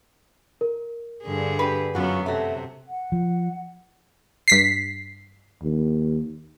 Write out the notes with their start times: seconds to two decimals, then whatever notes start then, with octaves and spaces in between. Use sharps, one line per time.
0.61 A#4
1.23 G2 D3 G#4
1.59 G4 B4
1.95 F#2 F#3 B3 F4 F#4
2.26 C3 F#3 A3
2.88 F#5
3.12 F3
4.48 G2 B6 C7
5.63 D#2